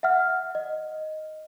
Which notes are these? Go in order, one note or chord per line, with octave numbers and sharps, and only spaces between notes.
E5 F#5 F6
D#5